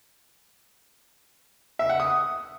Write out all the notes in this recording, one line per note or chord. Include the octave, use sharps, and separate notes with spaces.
E5
F#5
D#6